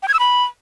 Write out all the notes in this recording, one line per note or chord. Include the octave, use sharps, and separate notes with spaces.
G5
G#6
E6
B5